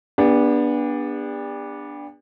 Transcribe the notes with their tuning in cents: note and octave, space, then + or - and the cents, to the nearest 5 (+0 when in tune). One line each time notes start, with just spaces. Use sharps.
B3 -20 D4 +0 G4 +40